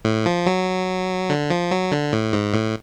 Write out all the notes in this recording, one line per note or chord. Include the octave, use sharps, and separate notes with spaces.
A2
F3
F#3
D3
F3
F#3
D3
A2
G#2
A2